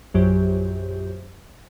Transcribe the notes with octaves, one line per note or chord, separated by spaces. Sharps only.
A#1 F#2 F#3 G4 C5 G6